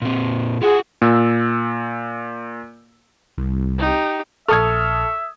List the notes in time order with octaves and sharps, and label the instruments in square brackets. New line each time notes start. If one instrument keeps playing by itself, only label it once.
[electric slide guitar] A#2 C4
[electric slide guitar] F4 F#4 F#5 [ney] G#4
[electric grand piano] A#2 E6
[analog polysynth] C2
[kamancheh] D#4 G4
[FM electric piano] A#1 F6 [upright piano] A4 [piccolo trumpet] E5 [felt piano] C#6 D#6 G#6